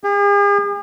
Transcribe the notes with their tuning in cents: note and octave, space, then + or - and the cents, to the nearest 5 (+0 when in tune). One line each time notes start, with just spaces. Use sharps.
G#4 -45